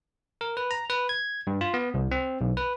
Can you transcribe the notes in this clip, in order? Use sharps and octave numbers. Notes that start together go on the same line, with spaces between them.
A#4
B4
A#5
B4
G#6
G2
F4
B3
C2
C4
B1
B4